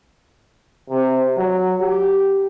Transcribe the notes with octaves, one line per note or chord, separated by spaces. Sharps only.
C3
F#3
G4